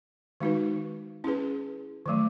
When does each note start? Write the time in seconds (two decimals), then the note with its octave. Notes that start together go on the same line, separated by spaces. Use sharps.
0.40 D#3 G#3 D#4 F#4 B4
1.24 C#4 E4 G#4 B4
2.06 D#3 F#3 A3